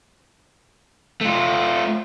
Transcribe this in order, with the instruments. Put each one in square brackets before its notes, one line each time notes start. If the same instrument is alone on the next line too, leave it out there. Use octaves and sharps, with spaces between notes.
[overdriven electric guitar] A3 F4